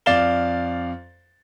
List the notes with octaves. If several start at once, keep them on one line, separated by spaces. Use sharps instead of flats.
F2 D5 F5 A6 E7 G7